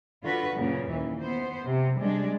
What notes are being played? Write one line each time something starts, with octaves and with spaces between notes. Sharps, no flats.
D3 F4 F#4 B4
F#2 A#2 C#3
D#2 E3
B3 C5
C3
G3 G#3 D4